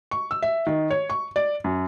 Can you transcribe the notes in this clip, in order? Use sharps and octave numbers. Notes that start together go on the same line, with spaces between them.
C#6
E6
E5
D#3
C#5
C#6
D5
F#2